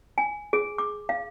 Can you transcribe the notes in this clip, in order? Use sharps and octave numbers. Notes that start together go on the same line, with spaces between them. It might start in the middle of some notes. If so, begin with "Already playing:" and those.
G#5
G#4
D6
F5